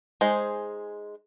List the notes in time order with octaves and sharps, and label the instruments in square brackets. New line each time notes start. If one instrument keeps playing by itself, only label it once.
[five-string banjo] G#3 D#4 G#4 C5